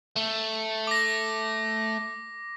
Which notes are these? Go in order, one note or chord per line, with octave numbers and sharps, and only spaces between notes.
A3
D6 A#6